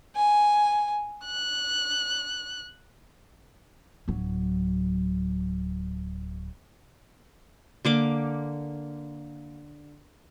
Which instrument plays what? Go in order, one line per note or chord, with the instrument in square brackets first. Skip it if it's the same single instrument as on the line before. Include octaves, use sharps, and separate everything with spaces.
[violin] G#5
F#6
[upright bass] D1 F#3
[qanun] D3 A#3 D6